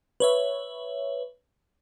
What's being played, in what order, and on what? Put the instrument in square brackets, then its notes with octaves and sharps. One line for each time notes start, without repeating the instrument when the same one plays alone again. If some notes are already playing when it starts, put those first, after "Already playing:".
[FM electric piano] B4 C#5 E5